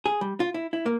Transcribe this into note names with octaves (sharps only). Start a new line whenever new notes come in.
G#4
G3
F4
E4
E4
A#3